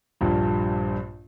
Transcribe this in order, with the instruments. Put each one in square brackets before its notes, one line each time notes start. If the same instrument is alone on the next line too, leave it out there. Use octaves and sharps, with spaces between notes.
[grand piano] A#1 G2 A#2